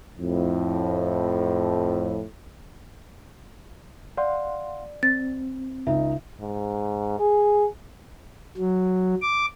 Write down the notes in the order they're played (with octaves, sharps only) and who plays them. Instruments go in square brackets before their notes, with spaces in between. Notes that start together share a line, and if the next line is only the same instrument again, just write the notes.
[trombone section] F2 A2
[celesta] D5 [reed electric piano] F5 F#5 C6
[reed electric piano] C4 [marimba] A6
[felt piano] C#2 D#4 [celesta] E5
[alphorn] G#2
G#4
[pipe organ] F#3
D6